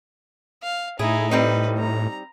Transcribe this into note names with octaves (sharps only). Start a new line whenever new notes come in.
F5
A2 D#4 E4 G#4
G3 C4 D#4 B4
A#5